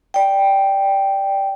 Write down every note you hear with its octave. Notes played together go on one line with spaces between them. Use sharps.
D5 G5